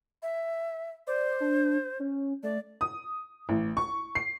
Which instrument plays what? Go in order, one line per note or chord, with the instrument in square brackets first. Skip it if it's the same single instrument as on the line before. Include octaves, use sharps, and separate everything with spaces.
[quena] E5
[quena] C5 [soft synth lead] D5
[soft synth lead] D4
C#4
[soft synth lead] A3 [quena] D5
[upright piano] D#6
A1
C#6
C7